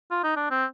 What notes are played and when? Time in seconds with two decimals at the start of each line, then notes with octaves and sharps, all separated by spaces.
0.11 F4
0.23 D#4
0.36 D4
0.51 C4